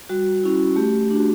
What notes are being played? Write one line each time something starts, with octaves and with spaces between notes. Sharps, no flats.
G3 F#4
C#4 E4
A3 G4
D4 F#4